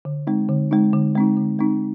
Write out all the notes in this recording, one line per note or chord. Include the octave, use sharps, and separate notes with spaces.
D3
G#3 C4 D#4
D3
G#3 C4 D#4
D3
G#3 C4 D#4
D3
G#3 C4 D#4